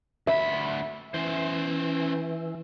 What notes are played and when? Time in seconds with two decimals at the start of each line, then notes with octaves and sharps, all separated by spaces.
0.27 D2 E5 B5
1.14 E3 C#4 C5